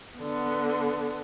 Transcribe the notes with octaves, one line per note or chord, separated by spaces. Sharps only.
D3 B3